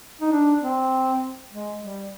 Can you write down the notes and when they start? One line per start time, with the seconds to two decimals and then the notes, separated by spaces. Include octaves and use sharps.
0.21 D#4
0.32 D4
0.61 C4
1.52 G#3
1.82 G3